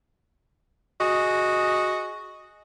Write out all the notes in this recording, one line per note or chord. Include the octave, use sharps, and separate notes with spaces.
F#4 G#4 D#5